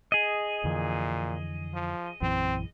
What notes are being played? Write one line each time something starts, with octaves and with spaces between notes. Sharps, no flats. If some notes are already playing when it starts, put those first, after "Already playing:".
G#4 D#5
F2 A#2 D3 E3
F3
A#1 F#2 E3 C4